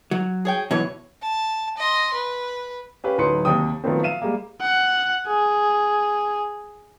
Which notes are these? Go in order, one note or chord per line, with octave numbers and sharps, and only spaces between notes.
F#3
G#4 C#5 G5
B2 E3 F#3 C#5
A5
D#5 C6
B4
C#4 G4 B4 F5
D1 F#3 D#4 B4 C6 C#7
D#2 C3 G5 D#6
D#3 F3 F#3 A3 B3 C4
E5 F5 D#7 E7
G3 G#3 A#3
F#5
G#4